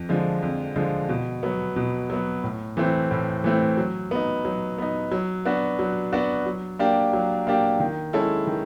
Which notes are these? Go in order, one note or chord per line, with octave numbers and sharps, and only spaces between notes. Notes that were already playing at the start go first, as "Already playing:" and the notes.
Already playing: F2
D3 F3 G#3
F2
D3 F3 G#3
B2
F#3 B3
B2
F#3 B3
A2
E3 A3 C4
A2
E3 A3 C4
F#3
B3 D#4
F#3
B3 D#4
F#3
B3 D4 F#4
F#3
B3 D4 F#4
F#3
A#3 D4 G4
F#3
A#3 D4 G4
D#3
G#3 C#4 E4 A4
D#3